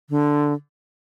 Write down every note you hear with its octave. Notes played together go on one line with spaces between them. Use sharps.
D3